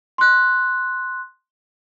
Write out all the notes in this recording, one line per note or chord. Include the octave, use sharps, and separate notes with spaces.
C6 F#6